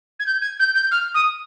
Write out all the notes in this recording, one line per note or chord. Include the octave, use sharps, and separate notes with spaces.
G#6
G6
G#6
G6
G6
F6
D#6